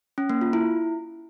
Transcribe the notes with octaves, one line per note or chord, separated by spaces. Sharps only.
C#4
A#3
F4
E4